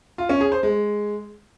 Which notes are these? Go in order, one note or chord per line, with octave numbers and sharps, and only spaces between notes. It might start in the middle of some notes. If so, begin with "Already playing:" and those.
F4
C#4
G#4
C5
G#3